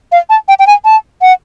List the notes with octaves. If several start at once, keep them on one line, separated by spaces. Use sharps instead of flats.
F5
A5
G5
G5
G#5
A5
F#5